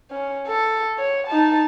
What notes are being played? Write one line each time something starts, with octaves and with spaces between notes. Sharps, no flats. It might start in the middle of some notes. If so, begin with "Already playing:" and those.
C#4
A4
C#5
D#4 A5